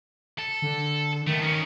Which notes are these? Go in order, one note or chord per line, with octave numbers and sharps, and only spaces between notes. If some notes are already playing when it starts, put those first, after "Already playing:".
A4
D3
D#3 A3 B3
C#4 D#4